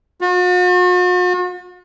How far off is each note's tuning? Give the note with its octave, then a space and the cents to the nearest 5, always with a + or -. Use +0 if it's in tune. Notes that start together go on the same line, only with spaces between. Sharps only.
F#4 -45